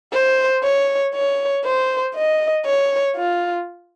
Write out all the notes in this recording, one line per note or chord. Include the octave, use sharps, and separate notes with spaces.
C5
C#5
C#5
C5
D#5
C#5
F4